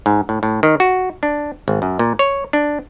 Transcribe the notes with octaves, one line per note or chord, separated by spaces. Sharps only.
G#2
A2
A2
D#3
F#4
D4
G#1
F#2
A#2
C#5
D4